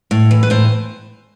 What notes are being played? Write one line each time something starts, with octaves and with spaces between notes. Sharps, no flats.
A2
E3
B4
A2 C5